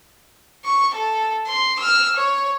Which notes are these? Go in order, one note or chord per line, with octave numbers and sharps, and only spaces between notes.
C#6
A4
C6
E6 F6
C#5